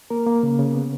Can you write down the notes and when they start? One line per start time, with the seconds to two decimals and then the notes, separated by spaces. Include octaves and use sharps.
0.10 A#3 A#4
0.26 A#3
0.43 C#3
0.59 C#3
0.75 B3